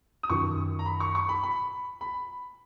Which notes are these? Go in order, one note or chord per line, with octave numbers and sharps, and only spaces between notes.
D#6
F#2 D#3 C#6
A#5
B5
C#6
C#6
B5
B5
B5